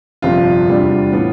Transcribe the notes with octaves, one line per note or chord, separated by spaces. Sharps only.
G1 F2 C3 F3 F4
E2 C3 G3 D4
A2 E3 B3